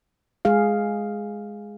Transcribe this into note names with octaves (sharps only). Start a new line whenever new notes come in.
G#3 G#4 F5